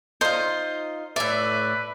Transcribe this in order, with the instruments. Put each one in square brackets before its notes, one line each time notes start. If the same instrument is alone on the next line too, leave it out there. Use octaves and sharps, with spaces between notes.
[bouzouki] D#4 F4 [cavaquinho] C5
[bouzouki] A2 E5 [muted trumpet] B4 [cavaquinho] D5